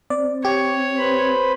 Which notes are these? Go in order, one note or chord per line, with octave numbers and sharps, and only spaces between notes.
C4 D5
G4 C#5
B4 C5 B5